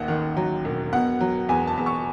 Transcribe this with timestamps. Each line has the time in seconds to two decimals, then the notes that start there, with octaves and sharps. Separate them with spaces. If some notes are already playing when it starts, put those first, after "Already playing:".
Already playing: A1 D#2 F#5
0.08 D#3
0.37 F#3
0.65 E1
0.93 B2 F#5
1.21 F#3
1.49 E2 G#5
1.67 A5
1.77 E2
1.86 C#6